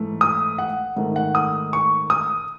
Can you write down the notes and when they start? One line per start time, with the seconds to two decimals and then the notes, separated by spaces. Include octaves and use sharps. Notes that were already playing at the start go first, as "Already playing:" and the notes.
Already playing: G#2 E3 A3
0.21 D#6
0.58 F#5
0.96 G#2 D#3 A3
1.16 F#5
1.35 D#6
1.73 C#6
2.10 D#6